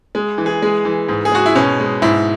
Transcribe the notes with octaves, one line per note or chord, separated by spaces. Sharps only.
G#3
E3
G#4
G#3
E3
G#2
G#4
G#3 F#4
E4
B2 C#4
G#3
G#2 E4